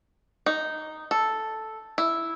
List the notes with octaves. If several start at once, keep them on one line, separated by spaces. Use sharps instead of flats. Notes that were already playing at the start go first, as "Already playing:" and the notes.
D#4
A4
E4